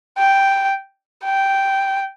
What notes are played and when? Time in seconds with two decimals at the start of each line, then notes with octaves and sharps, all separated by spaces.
0.18 G5
1.25 G5